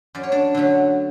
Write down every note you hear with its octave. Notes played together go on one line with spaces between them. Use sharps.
F#2 D5
C#5
D4 D5
D3 F#3 A3